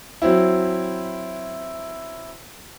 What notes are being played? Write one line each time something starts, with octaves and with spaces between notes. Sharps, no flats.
F#3 C4 E4